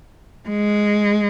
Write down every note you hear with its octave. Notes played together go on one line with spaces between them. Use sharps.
G#3